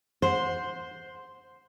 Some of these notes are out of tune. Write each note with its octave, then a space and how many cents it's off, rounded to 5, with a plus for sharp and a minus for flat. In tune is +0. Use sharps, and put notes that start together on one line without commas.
C5 +0 F#5 -30